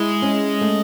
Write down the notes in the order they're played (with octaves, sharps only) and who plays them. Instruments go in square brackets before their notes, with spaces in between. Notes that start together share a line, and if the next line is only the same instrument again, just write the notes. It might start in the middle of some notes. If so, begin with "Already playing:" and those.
Already playing: [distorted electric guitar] G#3 [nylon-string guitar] E4
[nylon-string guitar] C#4
A3